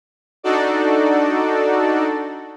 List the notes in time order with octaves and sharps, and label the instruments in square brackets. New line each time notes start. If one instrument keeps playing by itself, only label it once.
[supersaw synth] D4 D#4 F#4 A4 D5